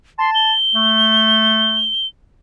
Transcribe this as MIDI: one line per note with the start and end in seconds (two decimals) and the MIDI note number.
0.19 0.52 81
0.19 0.30 84
0.35 2.07 103
0.75 1.90 57